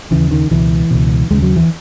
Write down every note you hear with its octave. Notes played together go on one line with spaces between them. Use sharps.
D#2 C#3 E3
D#3
C#2 B2 E3
C#2 B2
D#2 C#3 G#3
F#3
E3